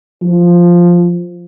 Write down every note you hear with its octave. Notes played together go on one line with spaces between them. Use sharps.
F3